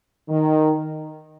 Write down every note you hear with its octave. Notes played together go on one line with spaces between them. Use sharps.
D#3